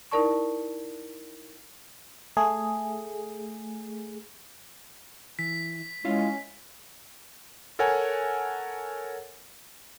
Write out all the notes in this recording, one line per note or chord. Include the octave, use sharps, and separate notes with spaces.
D#4 E4 A#4 D5 A5 C#6
A3 G#4
E3 B6
G#3 C#4 E4 F4 F5
A4 A#4 C#5 F#5 G#5